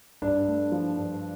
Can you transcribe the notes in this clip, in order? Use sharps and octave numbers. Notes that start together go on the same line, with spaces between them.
G2 D4
A3
F3
G2